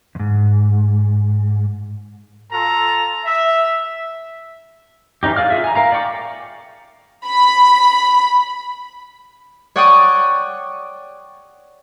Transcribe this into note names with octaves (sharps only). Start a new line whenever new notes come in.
E2 G#2
F4 A4 A5 A#5
E5
E3 C#4 D#4 G4
G#4 D5 F5 F6
F4 G#4 E5
G#5 A#5
A#4 F5 A#5
D5 F5 G5 C#6 D6
B5
C#5 D5 F#5 G5 C#6 D#6